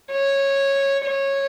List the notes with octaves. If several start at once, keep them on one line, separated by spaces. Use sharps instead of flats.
C#5
C#5